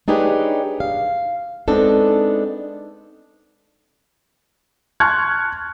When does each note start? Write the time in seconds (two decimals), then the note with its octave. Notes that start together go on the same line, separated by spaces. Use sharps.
0.08 D4 D#4 G4 G#4 B4 C#5
0.80 F5
1.68 G#3 B3 C4 D4 D#4 A4
5.00 A5 C6 C#6 F6 F#6 G#6